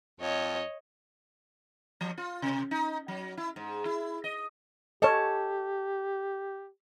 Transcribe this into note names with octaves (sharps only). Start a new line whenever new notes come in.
F2 C#5 D#5
F3
F4
C3
D#4
F#3
E4
G#2
E4
D#5
G4 A4 C#5 D#5 A5